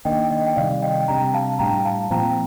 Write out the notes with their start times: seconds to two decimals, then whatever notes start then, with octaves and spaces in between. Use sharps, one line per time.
0.05 D#3 A#3 D4 D#5 G5
0.30 D#5 G5
0.46 G5
0.56 C3 D#3 G3 D5 F5
0.82 D#5 G5
1.08 C3 G3 D4 G5 A#5
1.34 F5 A5
1.59 A2 G3 D4 G5 A#5
1.85 F5 A5
2.10 A#2 F3 C4 G5 A#5